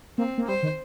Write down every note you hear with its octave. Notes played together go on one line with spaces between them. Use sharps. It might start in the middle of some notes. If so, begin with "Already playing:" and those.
A#3 C4
A#3
G3 C5
D#3